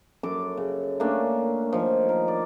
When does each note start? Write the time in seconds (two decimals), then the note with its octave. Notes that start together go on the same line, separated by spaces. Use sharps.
0.23 F#2 A4 D6
0.57 C#3
1.00 A3 A#3 C#4 D4
1.73 D#3 F3
2.09 A#4
2.28 D5